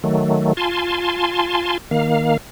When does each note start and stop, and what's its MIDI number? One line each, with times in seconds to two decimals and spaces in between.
0.04 0.53 51
0.04 0.53 54
0.04 0.53 57
0.57 1.77 65
0.57 1.77 80
0.57 1.77 81
0.57 1.77 84
1.91 2.37 51
1.91 2.37 58
1.91 2.37 77